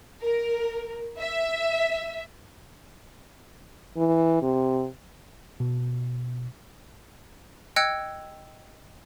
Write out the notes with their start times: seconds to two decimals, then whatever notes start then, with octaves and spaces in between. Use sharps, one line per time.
0.21 A#4
1.19 E5
3.97 E3
4.42 C3
5.60 B2
7.76 D#5 G5 E6 F#6 G#6 C#7